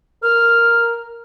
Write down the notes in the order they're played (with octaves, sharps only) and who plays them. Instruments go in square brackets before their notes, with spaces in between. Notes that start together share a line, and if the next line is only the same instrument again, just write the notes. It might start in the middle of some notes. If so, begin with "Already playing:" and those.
[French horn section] A#4 [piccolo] F6